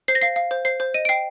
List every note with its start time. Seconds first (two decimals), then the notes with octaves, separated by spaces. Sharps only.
0.08 C5 C7
0.15 A#6
0.21 F5 C7
0.36 F5
0.51 C5
0.65 C5 C7
0.80 C5
0.94 D#5 D#7
1.05 D7
1.09 G5 C7